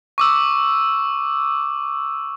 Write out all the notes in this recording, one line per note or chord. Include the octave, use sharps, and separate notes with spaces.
C#6 D6 E6